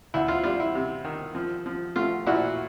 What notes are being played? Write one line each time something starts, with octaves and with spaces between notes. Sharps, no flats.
D2 E4
F4
G3 F4
E4
C3
D#3
F3
F3
A3 F4
A#2 E4 F#4